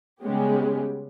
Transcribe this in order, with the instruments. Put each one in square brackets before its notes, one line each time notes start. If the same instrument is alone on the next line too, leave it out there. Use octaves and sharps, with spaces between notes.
[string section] C#3 G3 G#3 B3 C#4 G4